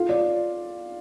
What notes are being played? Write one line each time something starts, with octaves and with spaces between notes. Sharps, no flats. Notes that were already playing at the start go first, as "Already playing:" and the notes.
Already playing: F4
D5